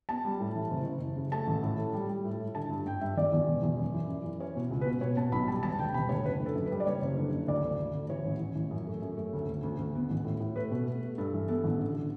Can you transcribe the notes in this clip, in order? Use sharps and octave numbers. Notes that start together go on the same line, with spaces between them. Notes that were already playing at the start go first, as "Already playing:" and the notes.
B3 A5
G3
A2
E3
F#1
F#1
F#1
C#3
A3 A5
A1
A2
A3
G3
G3
A2
E4
D3 A5
G2
G2 G5
G2 E5
E2 D5
E2
E1
E2
F#2
E3
F#2
E3
C#4 C#5
B2
C#2
B2 B4
B2 C#5
B2 A5
B1 B5
G3 A5
E1 A5
D2 G5
E1 B5
D2 C#5
F#1 B4
D3
A4
F#2
B4
G3
D5
F#1 C#5
F#1
D3
F#1
D2 D5
D2
D2
D2
E3 C#5
A1
E3
A1
F#2
A3
F#2
A3
D2
D2
D2
D2
B3
A1
A2
A2
A3 B4
B2
A3
A3
G2 A4
E3
B3 A4
A1
D3
D3